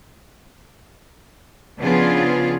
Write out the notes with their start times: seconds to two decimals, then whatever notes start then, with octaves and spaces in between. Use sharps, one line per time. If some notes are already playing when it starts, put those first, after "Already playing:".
1.78 C#3 F3 B3 D4 F4 G#4